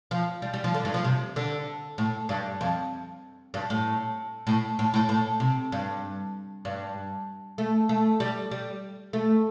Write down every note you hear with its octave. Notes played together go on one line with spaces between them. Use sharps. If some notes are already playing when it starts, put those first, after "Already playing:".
F3
G3
G3
F3
D3
G2
F3
C3
D3
A2
G2
F2
G2
A2
A2
A2
A2
A2
C3
G2
G2
A3
A3
G3
G3
A3